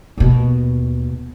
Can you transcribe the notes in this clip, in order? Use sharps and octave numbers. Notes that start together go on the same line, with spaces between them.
D#2 B2